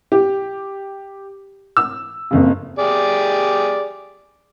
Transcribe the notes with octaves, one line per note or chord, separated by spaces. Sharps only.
G4
E6
F#1 F2 C#3
G4 G#4 D5